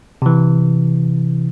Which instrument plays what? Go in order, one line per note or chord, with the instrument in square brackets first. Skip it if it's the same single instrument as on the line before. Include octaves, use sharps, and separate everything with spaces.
[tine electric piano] C3 E3